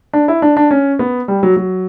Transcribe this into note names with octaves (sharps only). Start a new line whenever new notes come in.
D4
E4
D4
D4
C#4
B3
G3
F#3
F#3